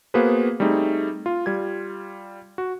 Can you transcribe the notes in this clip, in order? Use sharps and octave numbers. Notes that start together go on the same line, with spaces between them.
A#3 B3 F#4 G#4 B4 C5
G3 A3 C4 D#4 G#4
F4
G3 F4 G#6
F#4